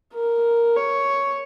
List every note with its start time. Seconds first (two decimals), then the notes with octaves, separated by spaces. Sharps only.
0.14 A#4
0.77 C#5